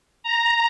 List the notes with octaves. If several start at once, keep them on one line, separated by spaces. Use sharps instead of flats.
A#5